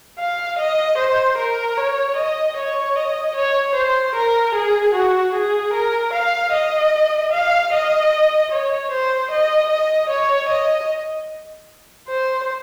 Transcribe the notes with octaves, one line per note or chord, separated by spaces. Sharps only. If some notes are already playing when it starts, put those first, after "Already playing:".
F5
D#5
C5
A#4
C#5
D#5
C#5
D#5
C#5
C5
A#4
G#4
F#4
G#4
A#4
F5
D#5
F5
D#5
C#5
C5
D#5
D#5
C#5
D#5
C5